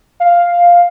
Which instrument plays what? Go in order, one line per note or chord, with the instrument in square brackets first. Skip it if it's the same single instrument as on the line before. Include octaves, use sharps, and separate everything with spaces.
[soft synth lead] F5